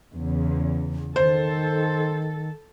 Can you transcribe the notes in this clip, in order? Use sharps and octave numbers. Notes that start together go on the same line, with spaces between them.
E2 C#3
D#3 A4 C5